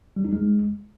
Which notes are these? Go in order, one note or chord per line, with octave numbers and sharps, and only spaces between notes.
G3
D#4
G#3